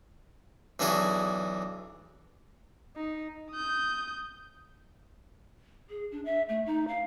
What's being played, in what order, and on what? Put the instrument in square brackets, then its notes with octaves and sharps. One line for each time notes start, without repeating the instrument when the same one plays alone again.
[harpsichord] B1 E3 D4 F#4 G#4
[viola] D#4
[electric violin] D#6 G6
[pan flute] G#4
D4
E5
A3
D#4
F5